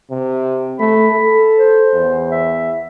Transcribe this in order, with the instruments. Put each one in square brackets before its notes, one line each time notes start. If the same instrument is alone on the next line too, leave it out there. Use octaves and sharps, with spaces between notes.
[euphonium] C3
[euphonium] A3 [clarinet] B5
[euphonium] A4
[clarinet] C5
[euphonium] E2
[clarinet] E5